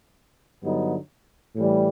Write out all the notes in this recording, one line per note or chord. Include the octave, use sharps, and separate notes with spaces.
G2 D3 F#3 B3 D#4
A2 E3 G3